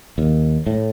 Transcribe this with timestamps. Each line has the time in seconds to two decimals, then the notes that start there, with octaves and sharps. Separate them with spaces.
0.18 D#2
0.67 A2